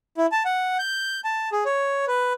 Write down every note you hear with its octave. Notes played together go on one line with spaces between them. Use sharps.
E4
A5
F#5
G6
A5
G#4
C#5
B4